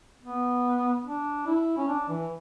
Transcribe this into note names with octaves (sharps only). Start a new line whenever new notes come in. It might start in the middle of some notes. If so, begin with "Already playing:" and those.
B3
D4
E4
C#4
D4
E3